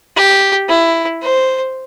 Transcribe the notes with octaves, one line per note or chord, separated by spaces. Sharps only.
G4
E4
C5